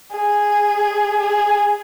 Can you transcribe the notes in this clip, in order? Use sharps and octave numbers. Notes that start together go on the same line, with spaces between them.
G#4
G#4